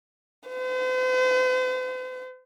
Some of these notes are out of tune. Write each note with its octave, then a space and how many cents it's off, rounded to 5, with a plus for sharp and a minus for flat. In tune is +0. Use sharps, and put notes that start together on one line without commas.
C5 -45